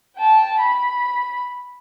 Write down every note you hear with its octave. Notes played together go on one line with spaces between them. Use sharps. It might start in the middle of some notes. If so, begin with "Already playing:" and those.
G5 A5
B5